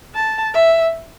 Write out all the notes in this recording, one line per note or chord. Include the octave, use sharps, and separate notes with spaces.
A5
E5